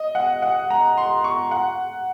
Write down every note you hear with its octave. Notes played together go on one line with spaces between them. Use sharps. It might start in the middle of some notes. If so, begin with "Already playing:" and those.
Already playing: D#5
F#5
F#5
A#5
C6
C#6
F#5